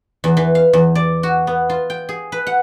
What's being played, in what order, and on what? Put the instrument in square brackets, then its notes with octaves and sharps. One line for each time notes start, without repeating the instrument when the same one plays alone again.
[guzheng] E2
E3
F5
E2
D5
F#4
B3
F4
G5
G#4
B4
F#5